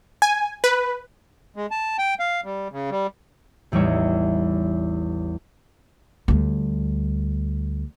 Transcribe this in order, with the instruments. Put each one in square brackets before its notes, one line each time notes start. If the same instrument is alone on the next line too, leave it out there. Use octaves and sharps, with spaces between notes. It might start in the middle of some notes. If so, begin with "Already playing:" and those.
[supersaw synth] G#5
B4
[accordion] G#3
A5
G5
F5
G3
C#3
G3
[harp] A1 E2 G3 D#4 C#5 E5
[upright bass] D2 G3